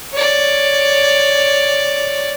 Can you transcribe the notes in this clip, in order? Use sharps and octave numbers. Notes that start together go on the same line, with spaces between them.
C#5 D5